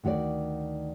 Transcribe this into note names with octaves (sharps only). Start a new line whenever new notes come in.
D2 D#3 F#4 C#5 D5